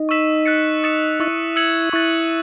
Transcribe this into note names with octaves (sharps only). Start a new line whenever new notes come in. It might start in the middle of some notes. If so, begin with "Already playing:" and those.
Already playing: D#4
C#6 E6 B6 E7
F#6 A6 C#7
D#6 A6 C#7 E7
E4 C#6 E6 A6
E6 G#6 C#7 F#7
E4 C#6 F#6 A6